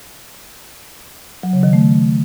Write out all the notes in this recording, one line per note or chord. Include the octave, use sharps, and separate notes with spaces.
F#3
C#3
D#3
A3